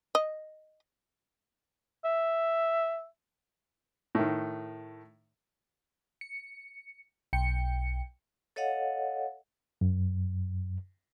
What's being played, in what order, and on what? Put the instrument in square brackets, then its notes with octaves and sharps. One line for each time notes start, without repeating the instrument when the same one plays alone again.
[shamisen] D#5
[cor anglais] E5
[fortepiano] A2 D#3
[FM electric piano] C#7
B1 G5 C#7
[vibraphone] A4 C#5 D#5 F5 F#5
[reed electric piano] F#2